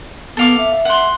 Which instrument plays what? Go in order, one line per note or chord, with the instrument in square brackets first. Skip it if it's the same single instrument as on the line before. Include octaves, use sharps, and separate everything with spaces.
[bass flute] B3 [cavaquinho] A4 F5 D6
[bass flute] E5
[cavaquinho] F#5 C6